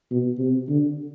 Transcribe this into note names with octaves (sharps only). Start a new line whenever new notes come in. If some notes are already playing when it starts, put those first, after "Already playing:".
B2
C3
D3